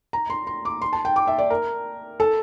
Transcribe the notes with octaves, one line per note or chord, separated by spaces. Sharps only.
A#5
C6
C6
D6
C6
A5
G5
D6
E5
D5
A#4
A4